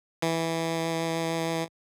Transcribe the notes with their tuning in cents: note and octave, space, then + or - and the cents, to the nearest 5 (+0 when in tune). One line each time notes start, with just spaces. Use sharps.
E3 -5